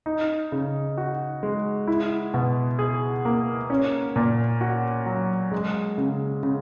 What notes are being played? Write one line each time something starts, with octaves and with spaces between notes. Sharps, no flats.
D#4
C#3
F#4
G#3
E4
B2
G#4
A#3
C#4
A#2
F#4
F#3
G#3
C#3
C#3